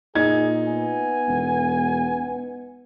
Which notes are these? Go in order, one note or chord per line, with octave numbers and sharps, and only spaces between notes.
A#2 D#4 G#4 G#6
B3 G#5
E1